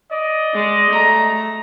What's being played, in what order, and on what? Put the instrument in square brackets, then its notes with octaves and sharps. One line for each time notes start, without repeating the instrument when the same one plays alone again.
[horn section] D5 D#5
[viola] G#3
A3 A#5